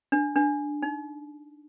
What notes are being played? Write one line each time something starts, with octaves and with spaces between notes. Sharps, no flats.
D4
D4
D#4